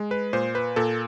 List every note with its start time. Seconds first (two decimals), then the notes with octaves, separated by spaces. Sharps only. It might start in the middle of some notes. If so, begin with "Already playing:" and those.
Already playing: G#3
0.11 B4
0.33 A#2 C5
0.55 B4
0.76 A#2 A4